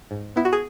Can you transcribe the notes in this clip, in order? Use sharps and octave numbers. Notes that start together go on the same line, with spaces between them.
G#2
B3 E4
F#4
G#4